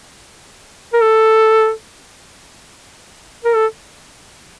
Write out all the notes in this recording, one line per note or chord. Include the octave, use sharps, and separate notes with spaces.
A#4
A4
A#4
A4